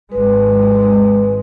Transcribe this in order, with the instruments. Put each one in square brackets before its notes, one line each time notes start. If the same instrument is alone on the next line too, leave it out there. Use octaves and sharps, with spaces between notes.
[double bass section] G#1 G#3 [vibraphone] B4